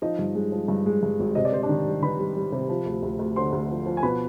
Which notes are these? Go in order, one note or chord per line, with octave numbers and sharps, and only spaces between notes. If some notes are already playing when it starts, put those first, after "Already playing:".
F3 D#4 D#5
G2
G#3
F3
G2
G#3
G2
G#1
C3 D#5
D5
C3 C5
D4 D5
D#3
G3
D#3 B4 B5
G3
G3
C3
F3
D2
D2
D2
D3 C5 C6
D2
F3
F3
G#5
B2 B4 B5